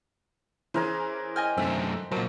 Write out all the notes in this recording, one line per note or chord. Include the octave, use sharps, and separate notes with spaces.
E3 C#4 E4 G#4 A#4 C5
D#5 G5 G#5 F6
F#2 D3 A3 C4 E5
A#2 F#3 A#4 C5 A5